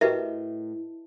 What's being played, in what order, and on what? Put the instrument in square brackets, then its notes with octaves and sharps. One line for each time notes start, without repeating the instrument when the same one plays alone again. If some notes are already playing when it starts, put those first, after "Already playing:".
[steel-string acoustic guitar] A2 [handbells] F#4 G4 A#4 [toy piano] B4 D#5 E5